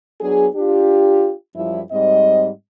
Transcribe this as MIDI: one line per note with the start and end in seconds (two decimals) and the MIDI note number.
0.21 0.48 54
0.21 0.48 59
0.21 0.48 62
0.21 0.48 68
0.56 1.32 62
0.56 1.32 65
0.56 1.32 67
1.55 1.82 42
1.55 1.82 53
1.55 1.82 55
1.55 1.82 64
1.92 2.49 44
1.92 2.49 55
1.92 2.49 60
1.92 2.49 75